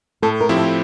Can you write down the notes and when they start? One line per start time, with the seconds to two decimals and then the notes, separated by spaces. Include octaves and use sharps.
0.22 A2 A4
0.40 A#4
0.49 F3 C4 E4 G4
0.57 A4